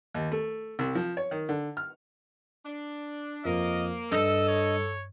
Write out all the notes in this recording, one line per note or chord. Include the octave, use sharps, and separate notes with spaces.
D#2
A3
C2
F3
C#5
D#3
D3
F6
D4
F2 A#3 D#5
G2 A4 D#5 E6
C#5